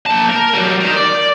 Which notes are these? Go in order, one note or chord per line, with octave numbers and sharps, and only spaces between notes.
A#3 A5
A#4
F#3 G3
D#4 A#4
D5